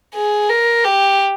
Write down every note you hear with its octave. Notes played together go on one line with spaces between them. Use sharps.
G#4
A#4
G4